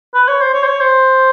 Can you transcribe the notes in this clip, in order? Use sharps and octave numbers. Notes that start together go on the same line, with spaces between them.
B4
C#5
C5
C#5
C5
C#5
C5